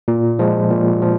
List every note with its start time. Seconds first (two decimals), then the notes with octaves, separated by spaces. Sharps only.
0.08 A#2
0.39 F3 G#3
0.71 A#2
1.02 F3